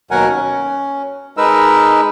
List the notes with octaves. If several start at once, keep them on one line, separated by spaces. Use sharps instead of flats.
D#2 B2 F#3 A#4 F#5 G#5
C#4
G#3 D#4 A#4 B4 E6